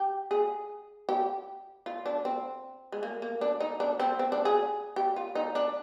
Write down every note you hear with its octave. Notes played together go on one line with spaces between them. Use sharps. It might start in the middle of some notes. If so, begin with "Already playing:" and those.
Already playing: G4
G#4
G4
F4
D4
C4
G#3
A#3
A#3
D4
D#4
D4
C4
C4
D4
G#4
G4
F4
D#4
D4